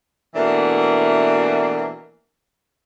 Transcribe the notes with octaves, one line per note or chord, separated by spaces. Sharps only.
B2 E3 A3 A#3 D4 F#4